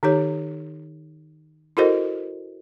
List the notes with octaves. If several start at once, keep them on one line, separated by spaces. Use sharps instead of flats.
D#3 D#4 G4 C#5
E4 F#4 A4 A#4 C5 D#5